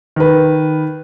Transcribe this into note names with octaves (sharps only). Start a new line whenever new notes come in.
D#3 B4